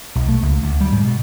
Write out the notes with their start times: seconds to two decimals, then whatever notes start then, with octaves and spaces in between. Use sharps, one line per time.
0.15 B1
0.28 A3
0.42 C#2
0.62 D2
0.81 G3
0.92 G#2
1.05 B2